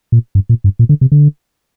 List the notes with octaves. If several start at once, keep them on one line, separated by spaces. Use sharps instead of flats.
A#2
G2
A#2
G2
A#2
D3
C3
D3